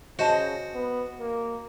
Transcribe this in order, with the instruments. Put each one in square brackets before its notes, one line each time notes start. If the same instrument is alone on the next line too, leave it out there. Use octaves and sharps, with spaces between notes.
[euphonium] C#3 [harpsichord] F#4 [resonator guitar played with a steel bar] C5 D#5 A5
[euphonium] B3
A#3